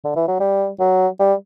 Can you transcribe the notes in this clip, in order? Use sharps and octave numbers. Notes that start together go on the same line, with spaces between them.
D3
E3
F#3
G3
F#3
G3